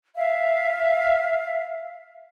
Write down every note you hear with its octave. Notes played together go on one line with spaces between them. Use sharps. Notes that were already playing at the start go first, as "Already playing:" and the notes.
E5 F5